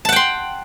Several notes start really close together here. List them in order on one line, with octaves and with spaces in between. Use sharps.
A5 F#5 G5 C6